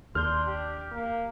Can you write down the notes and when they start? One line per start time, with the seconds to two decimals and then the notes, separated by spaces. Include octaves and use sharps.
0.15 D#2 D4 C6 F6 G6
0.46 G4
0.91 A#3